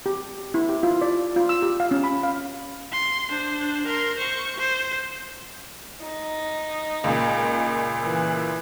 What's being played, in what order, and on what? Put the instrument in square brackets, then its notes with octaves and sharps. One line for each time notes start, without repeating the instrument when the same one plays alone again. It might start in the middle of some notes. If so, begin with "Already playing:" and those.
[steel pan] G4
E4
G4
F4
D5
F4
E6
G4
F5
C#4
B5
F5
[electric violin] C6
D4 C5
A#4 C6
C5 C#6
C5
[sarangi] D#4
[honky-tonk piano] C#2 A#2
[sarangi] E3